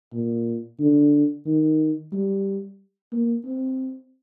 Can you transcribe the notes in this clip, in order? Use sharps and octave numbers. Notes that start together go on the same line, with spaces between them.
A#2
D3
D#3
G3
A#3
C4